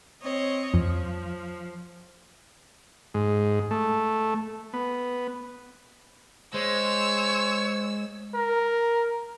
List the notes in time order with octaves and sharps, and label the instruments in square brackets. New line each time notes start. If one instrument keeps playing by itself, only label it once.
[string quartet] C4 C#5 D#5
[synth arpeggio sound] F2 [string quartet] F3
[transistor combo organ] G#2
A3
B3
[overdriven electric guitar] G#3 [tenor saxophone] C5 [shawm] C#5 [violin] E6
[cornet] A#4